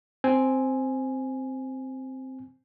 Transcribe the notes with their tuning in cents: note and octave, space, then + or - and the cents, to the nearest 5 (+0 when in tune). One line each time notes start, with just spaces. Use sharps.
C4 +0 G#5 +0